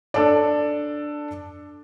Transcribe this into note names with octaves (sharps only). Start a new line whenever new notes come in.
D4 A4 D5